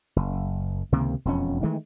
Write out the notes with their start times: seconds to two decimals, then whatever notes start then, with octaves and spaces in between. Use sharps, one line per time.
0.16 F#1
0.92 C#2 C3 D#3 A#3
1.25 E1 F2 C#4
1.63 D#3 E3 G#3 A3